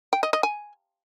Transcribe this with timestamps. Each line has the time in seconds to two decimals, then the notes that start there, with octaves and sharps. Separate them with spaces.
0.13 G5
0.23 D#5
0.33 D#5
0.43 G#5